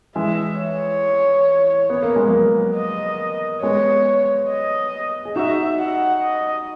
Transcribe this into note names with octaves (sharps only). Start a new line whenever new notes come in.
E3 G#3 E5
C#5
B3
A#3
G#3
F#3 A#3
D#5
G#3 B3 C#5
D#5
G#4
D#4 F#4 E5
F#5
D#5